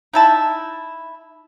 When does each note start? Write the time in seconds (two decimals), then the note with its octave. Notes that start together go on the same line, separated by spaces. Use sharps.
0.13 D#4 E4 A5